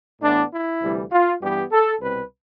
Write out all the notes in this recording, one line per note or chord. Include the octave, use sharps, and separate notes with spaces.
A2 E3 B3 D4
E4
D2 C3 E3 G3
F4
G2 E3 G3 B3 G4
A4
C2 B2 G3 C4 B4